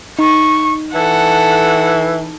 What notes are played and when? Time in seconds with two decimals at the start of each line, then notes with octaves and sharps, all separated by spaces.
0.19 D#4 C#6
0.95 E3 A4 F#5